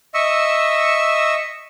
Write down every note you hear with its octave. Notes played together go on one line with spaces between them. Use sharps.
D#5 E5 C#6 E6